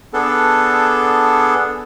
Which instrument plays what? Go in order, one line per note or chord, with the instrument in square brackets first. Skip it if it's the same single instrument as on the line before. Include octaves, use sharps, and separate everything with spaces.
[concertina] B3 D4 G#4 A4